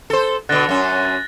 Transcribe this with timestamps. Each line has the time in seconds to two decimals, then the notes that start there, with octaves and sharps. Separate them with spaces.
0.10 A4 C5
0.49 B2 D3 F#6 A6 A#6
0.69 F#2 C#4
1.05 A6